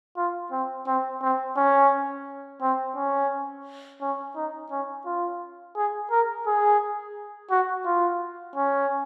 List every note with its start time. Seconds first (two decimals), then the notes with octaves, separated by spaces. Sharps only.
0.16 F4
0.52 C4
0.87 C4
1.22 C4
1.56 C#4
2.61 C4
2.96 C#4
4.01 C#4
4.36 D#4
4.71 C#4
5.06 F4
5.76 G#4
6.11 A#4
6.46 G#4
7.50 F#4
7.86 F4
8.55 C#4